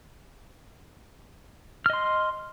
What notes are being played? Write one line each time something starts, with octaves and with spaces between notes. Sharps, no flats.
D#5 C6 F6